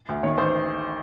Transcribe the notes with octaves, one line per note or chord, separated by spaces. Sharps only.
D2
D#3 C#5
A1 C5